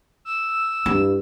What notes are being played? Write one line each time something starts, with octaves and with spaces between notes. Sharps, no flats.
E6
G2 E4